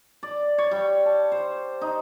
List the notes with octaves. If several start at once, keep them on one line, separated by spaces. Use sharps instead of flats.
D5
C#5
G3
A5
C5
D#4